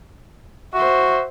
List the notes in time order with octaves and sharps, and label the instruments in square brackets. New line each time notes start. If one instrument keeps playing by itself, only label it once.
[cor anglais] F#4 [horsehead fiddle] C5 E5